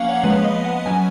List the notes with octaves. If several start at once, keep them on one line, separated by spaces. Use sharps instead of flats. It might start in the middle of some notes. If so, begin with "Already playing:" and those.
Already playing: F3 A#3 C#4 F5 F#5
C#5
F3 G#3 B3 B4
D#5
F#5
F#3 C#4 G#5